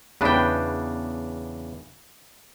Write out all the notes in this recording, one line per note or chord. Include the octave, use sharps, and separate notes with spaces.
E2 C#3 D4 B4 G5